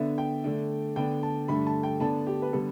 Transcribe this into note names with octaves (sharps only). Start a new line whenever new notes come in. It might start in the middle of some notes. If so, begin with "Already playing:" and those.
Already playing: D3 B3 D4 E5
G5
D3 A3 D4
D3 B3 D4 G5
A5
G2 D3 A3 D4 B5
A5
G5
D3 B3 D4 A5
G4
B4
D3 G3 B3 A4